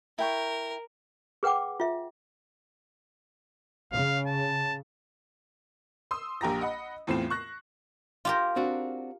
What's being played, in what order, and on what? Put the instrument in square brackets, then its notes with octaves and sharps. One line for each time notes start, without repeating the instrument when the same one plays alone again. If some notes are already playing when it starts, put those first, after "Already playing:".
[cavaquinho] E4 G5 C#6 [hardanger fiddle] A#4
[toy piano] G#4 B4 F#5 G5 D6
F4 E5
[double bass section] C#3 [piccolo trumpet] F5
[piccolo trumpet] A5
[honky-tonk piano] C6 D#6 E6
A#1 G4 A#5 A#6
D#5 F#5 B5
E2 A2 C4 F4 C7 E7
C#6 F#6 A#6
[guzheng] F4 G4 A#4
[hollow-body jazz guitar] C4 D4 F#4